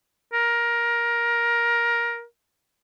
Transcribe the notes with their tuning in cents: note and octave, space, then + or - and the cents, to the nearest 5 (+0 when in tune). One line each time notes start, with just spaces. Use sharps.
A#4 +15